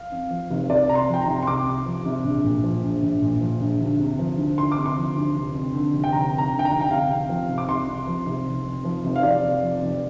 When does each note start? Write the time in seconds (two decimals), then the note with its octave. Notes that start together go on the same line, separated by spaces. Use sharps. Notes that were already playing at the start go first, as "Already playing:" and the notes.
Already playing: F5
0.12 F2
0.30 F3
0.50 F1
0.69 C2 D5
0.89 C3 A#5
0.95 C6
1.09 F3 G5
1.22 A#5
1.27 C2
1.42 C6
1.47 C2 D6
1.67 C3
1.86 F3
2.05 C2
2.24 A#1
2.44 A#2
2.64 F3
2.83 A#1
3.03 A#1
3.22 A#2
3.41 F3
3.61 A#1
3.80 D2
4.00 C3
4.19 F3
4.38 D2
4.58 D2 C6
4.72 D6
4.77 C3
4.86 C6
4.97 F3
5.16 D2
5.35 F1
5.55 F2
5.74 D3
5.93 F1
6.04 G5
6.13 F1 A#5
6.32 F2
6.38 A#5
6.52 D3
6.59 G5
6.65 A#5
6.71 F1
6.81 G5
6.91 C2 F5
7.10 C3
7.29 F3
7.49 C2
7.58 D6
7.68 C2 C6
7.88 C3
8.07 F3
8.26 C2
8.47 F1
8.65 F2
8.85 F3
9.04 F1
9.16 F5
9.23 F1 D5
9.43 F2
9.63 F3
9.82 F1